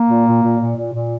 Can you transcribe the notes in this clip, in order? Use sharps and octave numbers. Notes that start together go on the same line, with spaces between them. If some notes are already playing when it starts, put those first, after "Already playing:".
Already playing: A#3
A#2
A#2
A#2
A#2
A#2
A#2